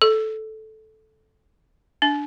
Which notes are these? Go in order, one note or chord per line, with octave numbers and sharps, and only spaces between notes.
A4
D4